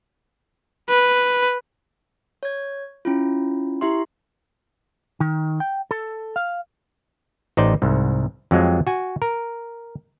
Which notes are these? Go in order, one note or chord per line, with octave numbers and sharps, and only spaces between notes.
B4
C#5 G#6
C#4 E4 F4
E4 G4 E5 C6
D#3
G5
A4
F5
A1 D#4 C5 D5
C2 G#2
F2 F#3 G#3 C4
F#4 G#5
A#4